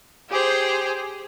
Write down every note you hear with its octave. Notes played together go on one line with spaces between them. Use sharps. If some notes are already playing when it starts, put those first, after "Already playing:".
G4 G#4 C5